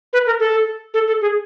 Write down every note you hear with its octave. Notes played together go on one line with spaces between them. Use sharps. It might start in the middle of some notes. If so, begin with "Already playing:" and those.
B4
A#4
A4
A4
A4
G#4